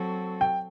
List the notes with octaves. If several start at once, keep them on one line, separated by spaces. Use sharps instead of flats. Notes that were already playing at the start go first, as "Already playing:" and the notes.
Already playing: F#3 C4 F#4 A4
G5